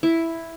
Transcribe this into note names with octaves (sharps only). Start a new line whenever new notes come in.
E4